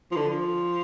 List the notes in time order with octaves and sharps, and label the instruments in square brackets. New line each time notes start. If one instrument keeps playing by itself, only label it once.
[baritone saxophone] F3
D3
F3